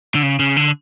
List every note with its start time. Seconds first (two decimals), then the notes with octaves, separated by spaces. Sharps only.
0.15 D3
0.23 C#3
0.39 C#3
0.57 D3